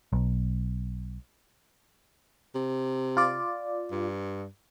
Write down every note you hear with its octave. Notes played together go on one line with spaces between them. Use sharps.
B1
C3
F4 D5
G2